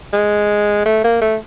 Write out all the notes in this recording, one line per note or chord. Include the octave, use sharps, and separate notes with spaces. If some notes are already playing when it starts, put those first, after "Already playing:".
G#3
A3
A#3
A3